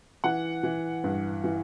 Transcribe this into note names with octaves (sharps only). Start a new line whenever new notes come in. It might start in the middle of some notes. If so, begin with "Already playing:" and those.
E3 F#5
E3
G2
E3